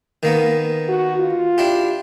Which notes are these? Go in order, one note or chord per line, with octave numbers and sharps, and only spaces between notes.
D#3 A#3 B3
F#4
F4
D4 E4 G4